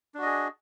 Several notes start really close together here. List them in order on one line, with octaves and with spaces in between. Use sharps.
D4 F#4 D#5 G#4